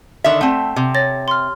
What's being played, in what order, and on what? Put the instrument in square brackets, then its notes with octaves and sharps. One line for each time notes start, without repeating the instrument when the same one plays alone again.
[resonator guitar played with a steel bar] D3 D#3 E5
[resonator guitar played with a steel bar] A3 C4 [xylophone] F#5 A5
[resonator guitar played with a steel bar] C3
[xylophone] C#5 A6 A#6
C6 F6